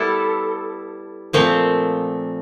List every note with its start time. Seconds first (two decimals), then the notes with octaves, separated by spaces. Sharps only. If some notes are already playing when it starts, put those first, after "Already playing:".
Already playing: G3 B3 E4 A4
1.33 A#2 F3 A3 C4